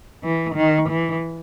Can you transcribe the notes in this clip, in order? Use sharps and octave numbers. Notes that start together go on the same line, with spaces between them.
E3
D#3
E3